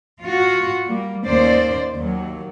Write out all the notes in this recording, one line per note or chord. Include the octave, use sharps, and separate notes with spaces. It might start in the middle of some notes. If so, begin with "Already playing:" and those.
F4 F#4
G3 A#3
D#2 A#3 C#4 C5 D5
D#2 F#3